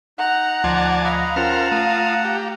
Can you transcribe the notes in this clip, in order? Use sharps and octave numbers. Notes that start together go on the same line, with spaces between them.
D#4 F#5 A#5
D2 F3 D5 G#5 A5 C6
D#5 F5 F#5 A#5 B5
C#4 F4 A#4 C5 F#5 G5 A5 F6
A3 F4 D#6
G4